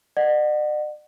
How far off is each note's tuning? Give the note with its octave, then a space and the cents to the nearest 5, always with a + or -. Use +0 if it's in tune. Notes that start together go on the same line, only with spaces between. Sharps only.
D5 +45 F#5 +0